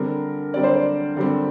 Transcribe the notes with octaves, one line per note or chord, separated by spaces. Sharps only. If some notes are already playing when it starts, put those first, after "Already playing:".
Already playing: D3 G3 C4 A#4
D3 G3 C4 D5
C5
D5
D3 G3 C4